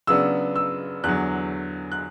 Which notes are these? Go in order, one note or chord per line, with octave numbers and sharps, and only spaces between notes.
C#3 F#3 B3 D4 E6
E6
E2 D3 F#3 F#6
F#6